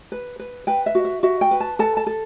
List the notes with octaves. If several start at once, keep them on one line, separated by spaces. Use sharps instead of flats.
B4
B4
B4 G5
E5
F#4
E5
F#4 E5
G5
B4
A5
A4 A5
A5
A4